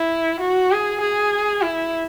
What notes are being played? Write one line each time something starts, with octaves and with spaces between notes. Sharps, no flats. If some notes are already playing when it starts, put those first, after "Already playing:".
Already playing: E4
F#4
G#4
G#4
E4